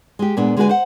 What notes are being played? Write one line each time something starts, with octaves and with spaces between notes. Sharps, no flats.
G#3 G4
A#2 G#3 B3 D4
D3 G#3 C4 F#4 B4 G#5
C5 F#5